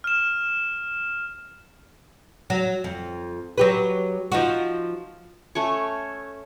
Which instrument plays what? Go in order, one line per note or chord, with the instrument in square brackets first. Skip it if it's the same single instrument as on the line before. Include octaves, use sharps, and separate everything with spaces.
[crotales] F6 E7
[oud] F#3
F2
F#3 G4 B4
F3 D#4 F#4
[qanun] A3 C#4 C#5